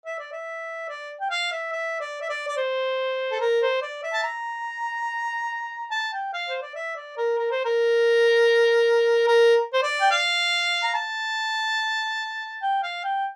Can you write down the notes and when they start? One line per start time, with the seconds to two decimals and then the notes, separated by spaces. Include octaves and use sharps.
0.06 E5
0.19 D5
0.32 E5
0.89 D5
1.20 G5
1.31 F5
1.52 E5
1.72 E5
2.01 D5
2.22 E5
2.29 D5
2.48 D5
2.57 C5
3.32 A4
3.41 A#4
3.62 C5
3.82 D5
4.04 E5
4.14 A5
4.24 A#5
5.91 A5
6.13 G5
6.33 F5
6.48 C5
6.62 D5
6.75 E5
6.96 D5
7.17 A#4
7.38 A#4
7.51 C5
7.65 A#4
9.27 A#4
9.73 C5
9.82 D5
10.01 G5
10.11 F5
10.83 A#5
10.95 A5
12.62 G5
12.83 F5
13.04 G5